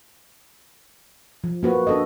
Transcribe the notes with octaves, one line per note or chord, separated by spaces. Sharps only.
F3
A#3 F#4 B4 C5
D4 A4 D#5